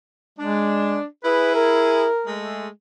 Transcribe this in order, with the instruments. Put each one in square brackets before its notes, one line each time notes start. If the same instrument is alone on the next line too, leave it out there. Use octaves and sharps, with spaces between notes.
[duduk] G#3 [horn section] D4
[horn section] E4 G#4 [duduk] B4
[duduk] A#4
[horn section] G#3 A3